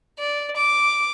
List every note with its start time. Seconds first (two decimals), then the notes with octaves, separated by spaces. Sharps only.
0.19 D5
0.57 D6